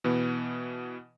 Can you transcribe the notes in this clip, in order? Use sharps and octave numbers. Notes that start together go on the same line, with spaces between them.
B2 E3 B3